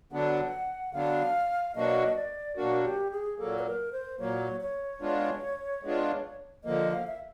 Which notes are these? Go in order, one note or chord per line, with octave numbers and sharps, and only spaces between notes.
D3 F#3 B3 D4 F#5
D3 F#3 B3 D4 F5
B2 F#3 A#3 D4 F#4 D#5
D5
B2 F#3 A#3 D4 F#4 A#4
G4
G#4
A#2 F#3 A#3 A4
B4
A#4
C5
A#2 F#3 A#3 C#5
C#5
G#3 B3 D4 F4
G#3 B3 D4 F4
D3 F3 A#3 D#5
F5
E5